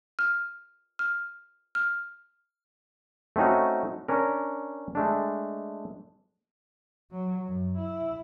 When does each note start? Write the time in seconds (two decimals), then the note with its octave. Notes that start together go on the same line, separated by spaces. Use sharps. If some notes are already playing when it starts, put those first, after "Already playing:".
0.19 F6
0.99 F6
1.75 F6
3.36 A3 C4 C#4 D#4 F#4
4.08 C#4 D4 A#4
4.95 G#3 A3 D4
7.11 F#3
7.47 F#2
7.77 E4